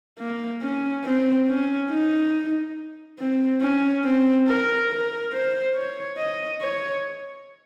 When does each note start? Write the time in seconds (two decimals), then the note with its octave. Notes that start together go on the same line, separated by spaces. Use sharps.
0.19 A#3
0.62 C#4
1.04 C4
1.48 C#4
1.90 D#4
3.19 C4
3.61 C#4
4.04 C4
4.47 A#4
4.90 A#4
5.33 C5
5.75 C#5
6.18 D#5
6.61 C#5